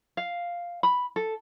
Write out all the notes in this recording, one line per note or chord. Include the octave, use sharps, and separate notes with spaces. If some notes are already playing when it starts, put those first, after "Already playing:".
F5
B5
A4